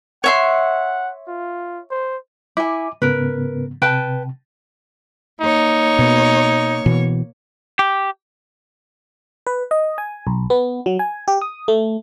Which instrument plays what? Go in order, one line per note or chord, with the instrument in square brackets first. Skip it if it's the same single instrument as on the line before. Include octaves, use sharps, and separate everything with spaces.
[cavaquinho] C#5 E5 C6 [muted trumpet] F#5
[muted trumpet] F4
C5
[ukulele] E4 G#5 [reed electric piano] D6
[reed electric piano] G#2 C#3 B3 [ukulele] A#4 B4
[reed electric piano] C3 [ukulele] B4 G5 A5
[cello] A#3 C#5 [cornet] D#4
[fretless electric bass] B2
B2 E3
[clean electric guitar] G4
[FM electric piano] B4
D#5
G#5
B1
B3
F#3
G#5
G4
D#6
A3